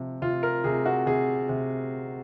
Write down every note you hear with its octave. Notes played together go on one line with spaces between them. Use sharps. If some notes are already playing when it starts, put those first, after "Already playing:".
Already playing: C3 F3
C3 F4
A#4
C3 G#4
F#4
C3 G#4
C3